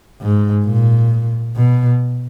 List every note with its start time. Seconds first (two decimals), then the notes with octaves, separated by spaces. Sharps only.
0.21 G#2
0.65 A#2
1.56 B2